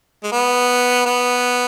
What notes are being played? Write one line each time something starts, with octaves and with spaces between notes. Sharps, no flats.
G#3
B3
B3